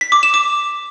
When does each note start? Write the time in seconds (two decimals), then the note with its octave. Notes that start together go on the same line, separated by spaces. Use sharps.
0.01 B6
0.12 D6
0.23 E7
0.34 D6